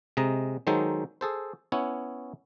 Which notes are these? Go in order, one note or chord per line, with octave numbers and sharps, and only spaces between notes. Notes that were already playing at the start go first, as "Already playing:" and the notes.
C3 G#3 D#5 A#5
D#3 F#3 G#3 D#4 A4 C5
G#4 A4 C5
B3 C#4 E4 C#5